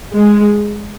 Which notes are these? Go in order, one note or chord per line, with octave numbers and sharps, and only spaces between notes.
G#3